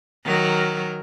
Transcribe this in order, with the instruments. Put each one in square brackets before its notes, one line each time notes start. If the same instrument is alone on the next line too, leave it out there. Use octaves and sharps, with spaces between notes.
[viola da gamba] D#3 F#3 A#4